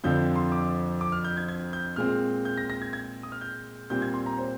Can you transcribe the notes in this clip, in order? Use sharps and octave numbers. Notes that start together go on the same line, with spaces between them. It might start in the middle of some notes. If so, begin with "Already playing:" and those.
F2 D3 F3 C4 G6
C6
D6
D6
F6
G6
G#6
G#6
G6
A#2 G#3 C4 F6
G6
A#6
A#6
G#6
G#6
D#6
F6
G6
A#2 G3 C4 G6
G#6
C6
A#5
C5